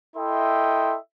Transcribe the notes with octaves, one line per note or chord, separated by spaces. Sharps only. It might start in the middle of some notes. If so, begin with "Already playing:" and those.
E4 A4 D#5 E5 G5 C6